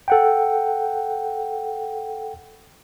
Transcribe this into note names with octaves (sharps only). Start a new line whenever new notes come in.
A4 F#5 G5